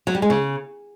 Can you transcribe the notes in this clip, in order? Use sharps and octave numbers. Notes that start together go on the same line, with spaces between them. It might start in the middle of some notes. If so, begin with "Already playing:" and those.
F#3
G3
G#3
C#3